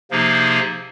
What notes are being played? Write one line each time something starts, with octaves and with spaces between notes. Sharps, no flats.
C3 F3 A#3 D#4 G#4